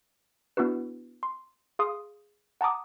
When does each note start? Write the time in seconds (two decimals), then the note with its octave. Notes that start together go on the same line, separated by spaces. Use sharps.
0.57 B3 D4 E4 F#4 B4
1.23 C6
1.79 G#4 F5 C6 D#6
2.61 F#5 A5 A#5 D6 D#6